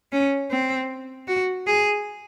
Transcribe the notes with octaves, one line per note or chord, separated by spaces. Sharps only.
C#4
C4
F#4
G#4